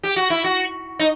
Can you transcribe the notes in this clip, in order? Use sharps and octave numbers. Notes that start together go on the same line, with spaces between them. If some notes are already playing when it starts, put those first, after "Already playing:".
G4
F#4
E4
F#4
D#4